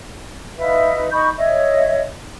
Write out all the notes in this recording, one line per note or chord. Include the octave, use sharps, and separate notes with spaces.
D#4 F4 B4 E5
D#4 B5 C#6 G6
C#5 D#5 E5